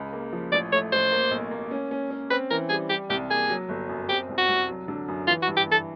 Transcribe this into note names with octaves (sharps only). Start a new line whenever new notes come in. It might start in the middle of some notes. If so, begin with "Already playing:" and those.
Already playing: C#2 C#3
A#3
F3
A1 D5
A3 C#5
A1 C5
A#3
B1
A#3
C#4
C#4
C#4
C4 B4
E3 A#4
G3 G#4
G3 G4
C2 G4
A#3 G#4
F#3
G1
F#2
C4 G4
C2
F#4
C2
F#3
D3
F#2
E3 F4
F#4
G2
G4
E3 A4